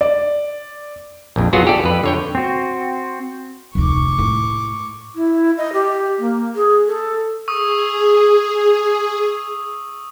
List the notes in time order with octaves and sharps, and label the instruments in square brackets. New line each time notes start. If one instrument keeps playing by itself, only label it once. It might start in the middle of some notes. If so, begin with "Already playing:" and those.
[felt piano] D5
[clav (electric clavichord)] A#1 F2
F#3 B3 F4 F#4 G#4
G4 A4 D5
F2 B4
D3 C#5 G5
[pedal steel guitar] C4 F#4
[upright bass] F1 D2 [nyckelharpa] C#6 D6
[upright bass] A2
[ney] E4
D#5
G4
A#3
G#4
A4
[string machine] G#4 [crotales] C#6 D#6 E6